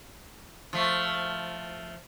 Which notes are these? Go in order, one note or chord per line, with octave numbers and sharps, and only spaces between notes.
F3 A3